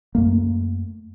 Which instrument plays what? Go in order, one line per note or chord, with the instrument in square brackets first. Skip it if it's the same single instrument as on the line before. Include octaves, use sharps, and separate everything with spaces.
[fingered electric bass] F#2 A3 A#3